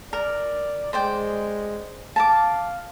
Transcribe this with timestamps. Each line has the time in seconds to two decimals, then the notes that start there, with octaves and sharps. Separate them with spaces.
0.13 A#4 D5
0.93 G#3 C5 D5 G5
2.16 F5 A5 A#5 D6